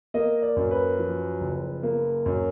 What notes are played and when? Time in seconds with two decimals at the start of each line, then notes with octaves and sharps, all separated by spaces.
0.14 A#3 D#5
0.42 D5
0.56 F#2
0.71 B4
0.99 F3
1.41 F#1
1.83 A#3
2.26 F#2